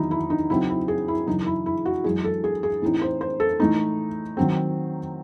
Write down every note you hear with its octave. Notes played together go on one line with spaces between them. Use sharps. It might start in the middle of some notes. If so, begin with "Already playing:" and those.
Already playing: E2 D#3 F#3 D#4 E4
E4
D#4
C#3 F#3 C4 D#4 E4
E4
G#4
E4
F#2 C#3 E3 D#4
E4
E4
F#4
F#2 E3 G#3 G#4
A4
G#4
G#4
A2 E3 C4 D#4
C5
C5
A4
A2 E3 A3 D#4
D#3 F#3 C4